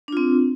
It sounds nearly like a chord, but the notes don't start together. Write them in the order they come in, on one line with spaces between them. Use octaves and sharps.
D4 F4 C4